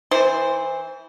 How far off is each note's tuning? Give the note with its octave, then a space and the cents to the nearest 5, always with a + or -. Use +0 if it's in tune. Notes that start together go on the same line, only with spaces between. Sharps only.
E3 -20 C5 +0